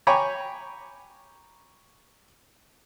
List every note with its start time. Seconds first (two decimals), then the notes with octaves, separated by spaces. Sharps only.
0.07 C#5 G5 G#5 A#5 B5 D6